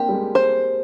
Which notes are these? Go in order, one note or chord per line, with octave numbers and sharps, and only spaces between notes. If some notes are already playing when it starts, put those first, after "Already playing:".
Already playing: A#3 C4 D4 G4
G3
G#3
C5